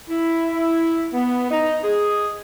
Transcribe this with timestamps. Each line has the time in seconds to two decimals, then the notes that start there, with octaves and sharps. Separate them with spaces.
0.09 E4
1.13 B3
1.51 D#4
1.84 G#4